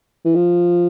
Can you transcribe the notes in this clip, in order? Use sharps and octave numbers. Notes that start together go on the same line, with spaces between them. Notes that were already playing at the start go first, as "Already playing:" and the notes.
E3
F3